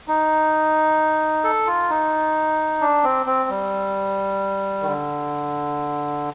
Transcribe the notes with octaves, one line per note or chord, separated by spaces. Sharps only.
D#4
A4
F4
D#4
D4
C4
C4
G3
D#3
D3